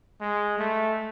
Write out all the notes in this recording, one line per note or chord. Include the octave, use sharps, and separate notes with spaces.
G#3
A3